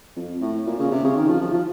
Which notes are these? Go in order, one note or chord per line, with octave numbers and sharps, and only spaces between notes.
F2
A2
A#2
C#3
C3
C#3
D#3
F3
F3
F3